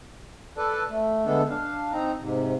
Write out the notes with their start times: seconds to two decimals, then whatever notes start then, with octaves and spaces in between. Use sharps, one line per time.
0.57 A4 B4 D5 A5
0.90 A3
1.26 D3 G#3 A3 B3 D4 A4
1.50 D4 F5
1.92 C4 D#4 A#5
2.20 G#2 C3